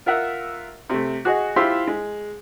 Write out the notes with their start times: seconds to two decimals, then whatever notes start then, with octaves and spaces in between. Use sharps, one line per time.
0.06 F4 A#4 E5 F#5
0.90 C3 A3
1.25 F#4 G#4 D#5
1.56 E4 F4 G4 C5 E5 C6
1.87 G#3